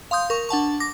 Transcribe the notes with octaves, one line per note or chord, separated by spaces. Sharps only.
F5 C6 D#6 G6
A#4 C#6
D4 F#5 A5 C#6
D6 A#6